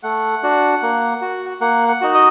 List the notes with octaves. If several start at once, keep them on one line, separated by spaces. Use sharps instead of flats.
A3 F#5
D4 F#4
A#3
F#4
A#3 F#5
F#5
D#4 F#4
D#5